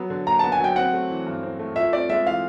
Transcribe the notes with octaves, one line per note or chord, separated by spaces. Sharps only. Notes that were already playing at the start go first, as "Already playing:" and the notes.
Already playing: F#3 B3
D3
D#2 A#5
B3 A5
G#5
F#3 G5
C4 F#5
A3
E3
G2
C4
A3
F4 E5
C4 D5
G#3 E5
E3 F5